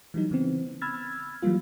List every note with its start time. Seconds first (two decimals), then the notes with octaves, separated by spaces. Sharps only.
0.14 E3 F#3 G3 D#4
0.31 C#3 E3 B3 C4
0.81 B5 E6 F6 G#6 A6
1.42 E3 F#3 G3 A#3 F4